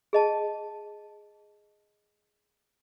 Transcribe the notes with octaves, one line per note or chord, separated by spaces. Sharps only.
G#4 D#5 A5